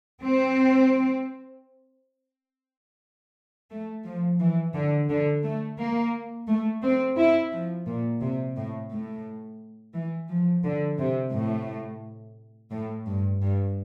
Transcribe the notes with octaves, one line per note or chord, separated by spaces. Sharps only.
C4
A3
F3
E3
D3
D3
A3
A#3
A3
C4
E4
F3
A#2
C3
A2
A2
E3
F3
D3
C3
A2
A2
G2
G2